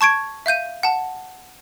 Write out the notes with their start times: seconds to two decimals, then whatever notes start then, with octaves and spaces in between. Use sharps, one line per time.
0.01 A5 C#6 G#6 D7
0.46 E5 F5 G6 D#7
0.83 F#5 A5